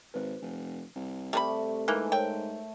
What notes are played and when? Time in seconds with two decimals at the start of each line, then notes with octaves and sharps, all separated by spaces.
0.14 G#1 B4 C5
0.41 F1
0.95 C2
1.33 C3 G3 A3 A#4 B5
1.88 G#2 E3 A#3 G#5 F#6 G7
2.12 A#4 C5 C#5 G5